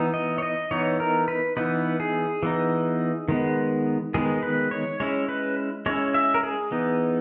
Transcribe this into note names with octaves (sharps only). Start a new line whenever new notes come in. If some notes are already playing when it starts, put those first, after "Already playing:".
Already playing: E3 B3 D#4
D#5
C#5
D#5
E3 B3 D#4 C#5
A#4
B4
E3 B3 D#4 B4
G#4
E3 B3 D#4
D#3 G#3 B3
D#3 G#3 B3 G#4
B4
C#5
G#3 C#4 E4 C#5
B4
G#3 C#4 E4 C#5
E5
A#4
G#4
E3 B3 D#4